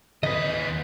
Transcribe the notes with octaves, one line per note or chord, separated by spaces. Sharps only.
D#2 B4 D#5